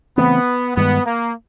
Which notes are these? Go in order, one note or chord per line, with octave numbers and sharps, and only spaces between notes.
C#3 E3 A3 B3 C4
G2 D#3 G#3 B3
A#3